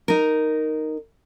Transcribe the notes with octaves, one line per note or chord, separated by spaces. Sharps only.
D#4 A#4